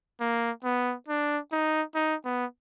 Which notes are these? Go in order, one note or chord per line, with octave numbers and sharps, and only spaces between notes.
A#3
B3
D4
D#4
D#4
B3